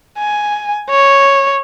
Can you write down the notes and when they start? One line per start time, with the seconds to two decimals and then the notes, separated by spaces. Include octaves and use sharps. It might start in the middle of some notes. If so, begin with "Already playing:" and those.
0.18 G#5
0.90 C#5